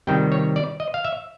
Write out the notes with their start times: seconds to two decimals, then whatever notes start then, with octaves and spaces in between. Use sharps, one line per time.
0.07 C3 D#3 G3 G5
0.32 C#5
0.56 D5
0.80 D#5
0.94 F5
1.05 E5